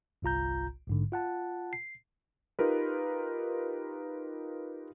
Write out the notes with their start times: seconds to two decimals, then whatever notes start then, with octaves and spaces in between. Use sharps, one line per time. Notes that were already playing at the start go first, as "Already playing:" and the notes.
0.22 G1 C2 F4 A#5 G6
0.87 A#1 G#2 D3
1.12 F4 F#5 A5
1.73 C7
2.59 D#4 F4 G4 A#4 B4